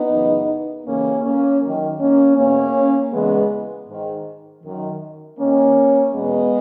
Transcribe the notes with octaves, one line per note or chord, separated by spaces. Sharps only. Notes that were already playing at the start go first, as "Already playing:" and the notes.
Already playing: B3 D#4
F#2 C#3 E3
D#2 C#3 E3 A#3 C#4
A#3 C#4
F#2 D#3
A#3 C#4
E2 B2 A#3 C#4
E2 C#3 E3 G#3 B3
G#2 D#3
F#2 D#3
D#2 D#3 A#3 C#4
E2 B2 G#3 B3